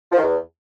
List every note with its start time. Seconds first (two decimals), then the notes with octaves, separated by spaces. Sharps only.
0.12 F3
0.17 D#3
0.23 E2